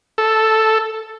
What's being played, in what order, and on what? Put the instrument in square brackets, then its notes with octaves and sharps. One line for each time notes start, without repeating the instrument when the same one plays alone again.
[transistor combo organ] A4